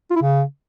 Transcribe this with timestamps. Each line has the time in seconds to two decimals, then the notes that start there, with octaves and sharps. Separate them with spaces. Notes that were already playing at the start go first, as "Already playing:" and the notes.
0.10 F4
0.16 E4
0.21 C#3